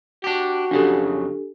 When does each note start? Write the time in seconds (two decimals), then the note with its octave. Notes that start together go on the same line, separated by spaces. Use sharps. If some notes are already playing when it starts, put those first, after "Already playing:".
0.24 D4 F#4 G4
0.71 F2 C#3 F#3 D4 G4 A4